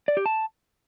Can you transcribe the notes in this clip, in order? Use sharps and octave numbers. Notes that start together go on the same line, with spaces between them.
D5
G4
A5